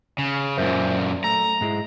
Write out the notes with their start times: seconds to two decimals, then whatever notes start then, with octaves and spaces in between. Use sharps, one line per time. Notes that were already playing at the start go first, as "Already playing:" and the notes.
0.18 C#3
0.57 F#2 A#2 A#4 C5 E5
1.24 A3 A#5
1.61 G#2 G#3 E4